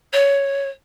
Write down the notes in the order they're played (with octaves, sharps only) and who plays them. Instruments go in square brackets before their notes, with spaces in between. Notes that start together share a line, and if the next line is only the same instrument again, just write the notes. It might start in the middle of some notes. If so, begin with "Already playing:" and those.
[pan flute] C#5